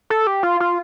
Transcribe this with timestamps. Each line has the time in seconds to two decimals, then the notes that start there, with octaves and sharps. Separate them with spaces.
0.10 A4
0.27 G4
0.43 F4
0.60 F4